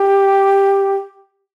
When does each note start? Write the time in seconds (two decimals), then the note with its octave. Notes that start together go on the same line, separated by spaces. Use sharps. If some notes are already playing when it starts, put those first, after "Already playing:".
Already playing: G4